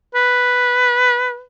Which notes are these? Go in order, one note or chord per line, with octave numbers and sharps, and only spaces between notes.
B4